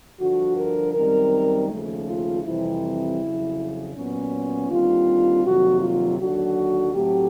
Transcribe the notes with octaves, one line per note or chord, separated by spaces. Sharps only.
G2 D3 F3 F#4
A#4
F#2 D#3 G3 C4 A#4
D#2 C#3 F3 A3
F4
F2 C3 E3 G3 C4 E4
F2 C#3 F#3
A#2 F#3 B3 C#4
D#2 D3 G3 C4 F4
F2 C3 D#3 F#3 A#3 F#4
F4
D#2 D3 F#3 F#4
A2 F#3 A3 C4 G4